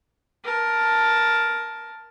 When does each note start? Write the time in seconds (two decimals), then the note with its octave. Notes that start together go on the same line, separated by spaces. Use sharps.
0.44 A#4 A5